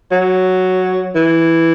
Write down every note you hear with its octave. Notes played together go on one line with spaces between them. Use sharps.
F#3
E3